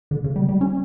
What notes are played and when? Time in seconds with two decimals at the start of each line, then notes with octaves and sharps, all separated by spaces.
0.11 D3
0.24 C#3
0.36 G3
0.49 G3
0.61 C#4